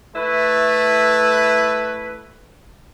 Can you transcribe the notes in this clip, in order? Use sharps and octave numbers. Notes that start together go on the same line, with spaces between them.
A3 E4 B4